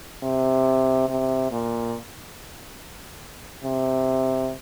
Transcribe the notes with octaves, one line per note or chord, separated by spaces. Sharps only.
C3
C3
A#2
C3